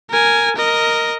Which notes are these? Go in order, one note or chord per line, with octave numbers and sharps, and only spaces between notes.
A#4 G#5
A#4 D#5